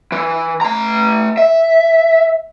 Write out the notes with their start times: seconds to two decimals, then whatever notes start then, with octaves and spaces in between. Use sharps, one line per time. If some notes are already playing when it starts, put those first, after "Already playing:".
0.12 E3
0.61 A3 A#5
1.37 E5